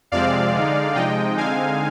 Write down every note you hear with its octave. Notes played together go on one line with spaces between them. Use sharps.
F2 C3 F3 G#3 C4 D5 F5
D3 G#3 D#4
C3 F3 G#3 D#4 D#5 G5
D3 G#3 C4 D#4 F5 G#5